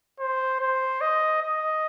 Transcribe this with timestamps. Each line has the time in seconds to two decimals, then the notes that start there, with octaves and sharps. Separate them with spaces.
0.20 C5
0.60 C5
1.01 D#5
1.42 D#5